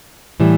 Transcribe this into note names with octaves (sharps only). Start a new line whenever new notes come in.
A2 E3 G3